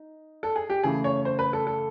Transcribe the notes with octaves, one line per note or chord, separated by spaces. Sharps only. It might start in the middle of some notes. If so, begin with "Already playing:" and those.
Already playing: D#4
A4
G#4
G4
C#3 E3 A3 G#4
C#5
C5
B4
A4
A4